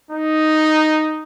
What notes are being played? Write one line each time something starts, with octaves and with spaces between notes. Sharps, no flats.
D#4